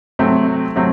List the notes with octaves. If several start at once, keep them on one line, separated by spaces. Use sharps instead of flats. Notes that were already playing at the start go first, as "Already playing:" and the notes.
C3 F#3 A3 C4
C3 F#3 A3 C4